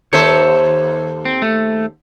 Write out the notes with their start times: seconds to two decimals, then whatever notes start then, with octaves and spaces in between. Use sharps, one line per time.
0.13 D#2 A4 C5 C#5 E5
1.25 C4
1.42 A3